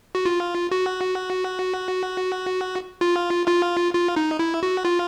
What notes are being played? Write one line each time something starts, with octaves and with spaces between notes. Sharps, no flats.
F#4
F4
F#4
F4
F4
F4
D#4
E4
F#4
F4